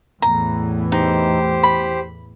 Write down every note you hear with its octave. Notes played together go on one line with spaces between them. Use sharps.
E2 A2 E3 A#5
D#4 G4 C5
B5